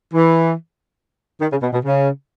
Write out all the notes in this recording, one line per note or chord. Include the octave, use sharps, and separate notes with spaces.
E3
D#3
C#3
B2
B2
C#3